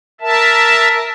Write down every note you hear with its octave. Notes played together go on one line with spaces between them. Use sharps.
A#4 E5 A5